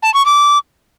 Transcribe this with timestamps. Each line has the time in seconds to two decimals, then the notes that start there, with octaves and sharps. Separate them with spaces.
0.03 A5
0.14 C#6
0.26 D6